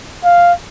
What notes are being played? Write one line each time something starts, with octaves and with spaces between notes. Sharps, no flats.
F5